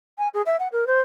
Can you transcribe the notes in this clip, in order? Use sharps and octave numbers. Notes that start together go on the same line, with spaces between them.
G#5
G#4
E5
F#5
A#4
C5